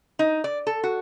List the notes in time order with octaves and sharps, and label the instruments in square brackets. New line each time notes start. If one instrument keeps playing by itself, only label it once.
[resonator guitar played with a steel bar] D#4
D5
A4
F#4